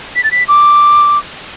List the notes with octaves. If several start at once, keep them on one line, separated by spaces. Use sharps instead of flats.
B6
A6
B6
D6